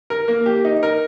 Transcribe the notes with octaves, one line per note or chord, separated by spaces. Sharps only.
A#4
A#3
G4
D#4
A#4